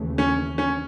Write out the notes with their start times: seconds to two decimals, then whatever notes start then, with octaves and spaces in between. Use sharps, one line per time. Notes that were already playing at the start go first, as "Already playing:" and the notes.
Already playing: D#2 C#3 E3 A3
0.18 C#4
0.58 C#4